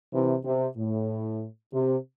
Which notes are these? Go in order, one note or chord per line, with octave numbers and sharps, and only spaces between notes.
C3 E3
C3
A2
C3